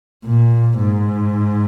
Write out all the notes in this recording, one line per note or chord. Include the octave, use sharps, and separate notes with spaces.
A#2
G#2